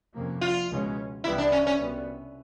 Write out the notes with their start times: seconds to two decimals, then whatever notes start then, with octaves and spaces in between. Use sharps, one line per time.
0.14 F2 C3 F3 A#3 C#4
0.41 F4
0.70 C#2 B2 G#3 C#4
1.24 C2 C3 E3 G3 B3 E4
1.38 D4
1.52 C#4
1.67 C#4
1.79 C2 B2 G3 B3